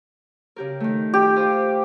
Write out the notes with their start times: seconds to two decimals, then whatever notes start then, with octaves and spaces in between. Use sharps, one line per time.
0.56 C#3 G4 A#4
0.80 D#3 A3
1.14 G4
1.36 F4 C5 G5